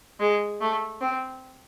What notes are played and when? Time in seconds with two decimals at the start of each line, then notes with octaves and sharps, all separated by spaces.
0.20 G#3
0.61 A3
1.01 C4